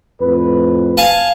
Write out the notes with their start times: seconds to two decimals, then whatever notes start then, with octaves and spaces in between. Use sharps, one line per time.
0.21 F2 A2 B4
0.97 F5 G#5 A5